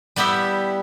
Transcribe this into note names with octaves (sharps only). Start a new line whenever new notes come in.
G3 B3 E4 G4 E5